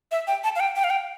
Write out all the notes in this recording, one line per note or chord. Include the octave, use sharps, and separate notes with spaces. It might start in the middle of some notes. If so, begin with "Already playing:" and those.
E5
G5
A5
F5
G5
G5
F5
G5